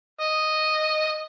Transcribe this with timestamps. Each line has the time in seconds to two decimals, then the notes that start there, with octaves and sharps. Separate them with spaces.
0.21 D#5